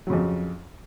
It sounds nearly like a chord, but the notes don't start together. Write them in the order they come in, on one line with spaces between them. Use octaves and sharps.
F#3 C#3 F2